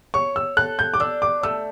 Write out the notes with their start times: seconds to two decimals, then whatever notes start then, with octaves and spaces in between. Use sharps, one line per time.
0.14 C#5 C#6
0.36 E6
0.57 A4 F#6
0.79 G6
0.94 D6
1.00 D4 E6
1.22 D6
1.43 A3 E6